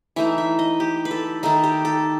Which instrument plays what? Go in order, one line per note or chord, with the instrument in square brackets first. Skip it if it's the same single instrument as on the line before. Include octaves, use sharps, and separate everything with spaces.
[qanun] E3 A3 D#4 E5
E5
D#5
G4
B4
A4
D#3 A3 D#4 A4
G4
A4